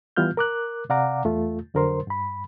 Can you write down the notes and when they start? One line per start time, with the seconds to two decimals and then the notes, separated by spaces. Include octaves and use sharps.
0.17 E3 G3 B3 F4 F6 G6
0.37 A#4 D6 F#6
0.90 C3 D5 F5 F#5 A#5 D6
1.25 E2 A3 F4
1.74 F2 D3 F#3 A#4 C5 C6
2.07 G2 B5